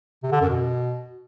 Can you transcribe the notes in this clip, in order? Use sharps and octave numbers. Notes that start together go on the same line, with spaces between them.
C3
D3
F#2
B2